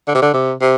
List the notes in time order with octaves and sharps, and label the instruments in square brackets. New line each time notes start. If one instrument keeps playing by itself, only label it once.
[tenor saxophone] D3
C3
D3
C3
C3